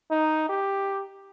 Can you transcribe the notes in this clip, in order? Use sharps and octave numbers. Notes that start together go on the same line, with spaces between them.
D#4
G4